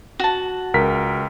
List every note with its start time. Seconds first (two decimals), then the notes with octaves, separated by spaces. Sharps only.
0.20 F#4 A5
0.74 C#2 A#4 B6